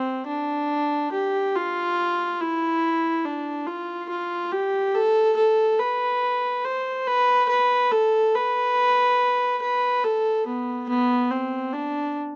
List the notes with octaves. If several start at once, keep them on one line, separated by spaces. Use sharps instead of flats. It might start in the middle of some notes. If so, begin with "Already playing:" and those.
Already playing: C4
D4
G4
F4
E4
D4
F4
F4
G4
A4
A4
B4
C5
B4
B4
A4
B4
B4
A4
B3
B3
C4
D4